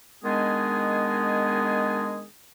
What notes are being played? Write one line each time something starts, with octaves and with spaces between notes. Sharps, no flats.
D#3 G#3 B3 D4 G#4